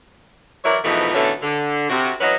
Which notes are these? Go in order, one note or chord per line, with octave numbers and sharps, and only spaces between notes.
E3 F#3 E4 A#4 C#5 D5
G#2 B2 E3 F3 A3 D#4
B2 D3 E3 A3 C#4 A4
D3
C3 F#4
E3 F#3 C#4 F#4 B4 D#5